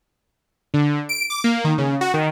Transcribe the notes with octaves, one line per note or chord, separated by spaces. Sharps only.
D3
D7
D6
A#3
D#3
C#3
F#4
D#3